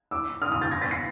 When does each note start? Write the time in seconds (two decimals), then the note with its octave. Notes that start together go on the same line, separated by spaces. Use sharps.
0.11 D6 E6
0.42 D#6 F6
0.52 D#6 F6
0.61 G6 A6
0.71 G#6 A#6
0.81 A6 B6
0.91 A#6 C7